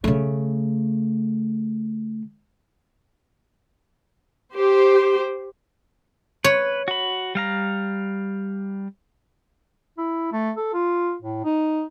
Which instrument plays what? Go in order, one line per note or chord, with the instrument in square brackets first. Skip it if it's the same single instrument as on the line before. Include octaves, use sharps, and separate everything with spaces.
[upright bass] C#3 A3
[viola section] G4 C5
[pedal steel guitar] B4 [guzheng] C#5
[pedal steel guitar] F#4 B5
G3 F5 A#5
[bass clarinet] E4
A3
A4
F4
A2
D#4